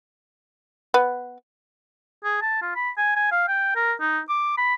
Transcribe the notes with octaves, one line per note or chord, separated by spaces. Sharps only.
B3
G#4
A5
F4
B5
G#5
G#5
F5
G5
A#4
D#4
D6
B5